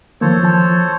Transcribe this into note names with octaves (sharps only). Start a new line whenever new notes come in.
D#3 F3 A#3 A4 C5 C#5
E3 F3 A5